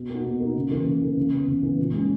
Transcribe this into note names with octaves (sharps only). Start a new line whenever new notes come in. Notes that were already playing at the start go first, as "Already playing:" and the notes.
Already playing: B2
A#3 D#4 F#4
B2
A#3 D#4 F#4
C#3
E3 A#3
C#3
E3 A#3
C#3
E3 B3
C#3
E3 B3
A#2
G#3 C#4